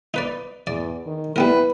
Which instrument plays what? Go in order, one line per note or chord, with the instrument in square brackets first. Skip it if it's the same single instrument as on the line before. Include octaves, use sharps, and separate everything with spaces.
[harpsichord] D#4 B4 D5
[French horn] E2 [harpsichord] D5
[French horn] D#3
[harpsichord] G3 B3 A#4 [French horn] E4 [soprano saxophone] B4